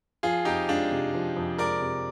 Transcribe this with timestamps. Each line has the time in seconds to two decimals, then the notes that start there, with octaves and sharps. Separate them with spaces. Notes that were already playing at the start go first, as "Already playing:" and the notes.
0.23 F3 F4 G#4
0.45 F2 D#4 G4
0.69 G#3 D4 F4
0.91 C3
1.14 F3
1.37 F2
1.58 G#3 A#4 D5
1.81 C3